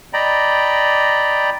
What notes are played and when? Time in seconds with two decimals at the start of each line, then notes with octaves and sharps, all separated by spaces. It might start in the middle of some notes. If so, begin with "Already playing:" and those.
0.13 D5 D#5 G5 A#5 B5